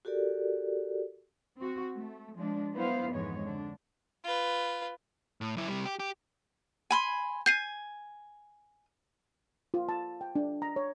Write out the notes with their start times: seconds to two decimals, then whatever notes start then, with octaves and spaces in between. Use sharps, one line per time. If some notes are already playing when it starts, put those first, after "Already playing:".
0.05 F#4 G4 A4 A#4 D5
1.58 C4 F#4
1.94 A3
2.35 F3 G#3 D4
2.74 F#3 B3 E4 B4 C5 F5
3.10 F2 G#2 E3 G#3 B3 C#5
3.43 D3 D4
4.24 F4 B4
5.41 A2
5.57 F#2 E4
5.68 C3 G3
5.85 G4
6.00 G4
6.91 G#5 B5 C6
7.46 G#5 G6 C7 D#7
9.74 F4
9.89 A5
10.21 G5
10.36 D4
10.62 A#5
10.76 C#5